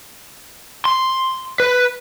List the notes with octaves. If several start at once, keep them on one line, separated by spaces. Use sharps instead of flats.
C6
B4